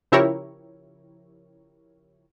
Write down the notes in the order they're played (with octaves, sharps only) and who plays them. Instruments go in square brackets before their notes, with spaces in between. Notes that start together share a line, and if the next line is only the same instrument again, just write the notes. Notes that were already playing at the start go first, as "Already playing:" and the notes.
[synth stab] C#3 F3 E4 G4 A#4 C#5